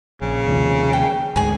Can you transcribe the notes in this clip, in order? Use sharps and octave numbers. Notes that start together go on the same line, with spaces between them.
A#1 C#3
D#2 C3 F3
G5
D2 G#2 G#4 G#5